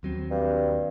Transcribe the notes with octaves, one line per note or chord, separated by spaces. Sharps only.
D#2 F#3 C4
G2